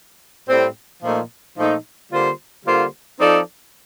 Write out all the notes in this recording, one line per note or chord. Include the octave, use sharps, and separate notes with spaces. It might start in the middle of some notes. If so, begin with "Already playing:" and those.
A2 G3 C4
A#2 F3 A3 D#4
A#2 F3 A3 D#4
D3 G3 A#3 F4 C5
D3 G3 A#3 F4 C5
F3 C4 D#4 A4 D5